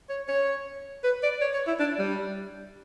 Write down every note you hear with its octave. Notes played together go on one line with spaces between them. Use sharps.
C#5
C#5
B4
D5
C#5
C#5
E4
D4
G3